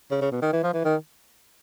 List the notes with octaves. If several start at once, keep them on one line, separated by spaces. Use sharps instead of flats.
C#3
C#3
B2
D#3
E3
F3
E3
D#3